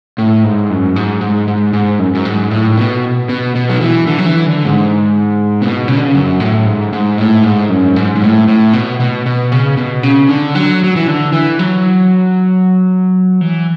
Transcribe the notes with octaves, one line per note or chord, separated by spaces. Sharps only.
A2
G#2
F#2
G#2
G#2
G#2
G#2
F#2
F#2
G#2
A2
B2
B2
B2
F#3
E3
D3
F#3
E3
D3
G#2
B2
C#3
D3
C#3
F#2
A2
G#2
G#2
A2
G#2
F#2
G#2
G#2
A2
A2
B2
B2
B2
C#3
B2
C#3
D3
F#3
F#3
E3
D3
E3
F#3
E3